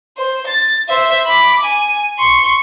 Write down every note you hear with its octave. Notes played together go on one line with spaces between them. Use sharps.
C5
A6
C5 E5
B5 D6
G#5
C6 C#6